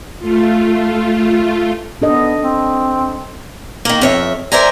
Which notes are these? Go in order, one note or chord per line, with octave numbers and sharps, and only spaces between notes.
A3 F4
B3 D4 A4 D#5
C4
D#3 A#3
F2 C#5 E5
A#4 C5 D5 E5 G#5 A#5